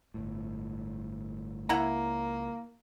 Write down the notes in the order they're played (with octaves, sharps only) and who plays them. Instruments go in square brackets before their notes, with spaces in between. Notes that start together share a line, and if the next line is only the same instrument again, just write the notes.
[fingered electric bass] G1 A2
[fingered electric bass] C#2 [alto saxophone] A#3 [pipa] E4 F#5 A#5